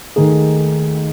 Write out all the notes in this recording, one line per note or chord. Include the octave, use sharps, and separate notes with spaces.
D#2 D#3 A3 D#4 G#4